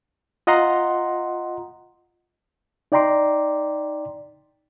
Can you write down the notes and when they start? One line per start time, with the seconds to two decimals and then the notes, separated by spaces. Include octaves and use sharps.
0.47 F4 D#5 F#5 A#5 C6
2.92 D#4 D5 G5 A#5 C6 D6